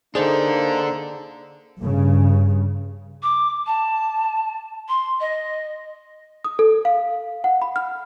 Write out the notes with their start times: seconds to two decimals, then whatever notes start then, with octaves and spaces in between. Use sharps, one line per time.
0.15 A#3 D4 D#4 G#4 A4 C5
1.79 G2 C#3
3.22 D6
3.66 A5
4.88 C6
5.20 D#5
6.44 D#6
6.59 A4
6.85 F5
7.44 F#5
7.62 B5
7.76 F6